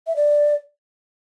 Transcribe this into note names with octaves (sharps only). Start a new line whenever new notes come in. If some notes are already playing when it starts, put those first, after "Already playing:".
E5
D5